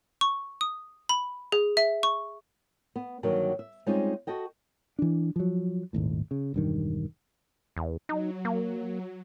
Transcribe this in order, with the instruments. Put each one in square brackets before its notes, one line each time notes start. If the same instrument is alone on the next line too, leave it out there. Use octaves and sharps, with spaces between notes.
[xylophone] C#6
D#6
B5
G#4
E5
C#6
[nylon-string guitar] B3
G2 D3 D#3 F#3 A#3 F#4
E5
G3 G#3 C4 C#4 D#4 F4
F#4 A4 D#5 G5
[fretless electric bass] E3 D4
F3 F#3
D#1 G#1 A2
C#3
E1 G2 D#3
[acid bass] E2
[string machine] F#3 [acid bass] D#4
[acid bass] A#3